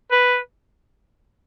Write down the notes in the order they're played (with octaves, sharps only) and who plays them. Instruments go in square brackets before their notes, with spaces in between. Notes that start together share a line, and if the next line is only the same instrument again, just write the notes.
[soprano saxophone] B4